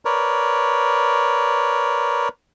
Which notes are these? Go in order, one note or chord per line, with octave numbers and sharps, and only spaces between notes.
A#4 B4 C#5 D5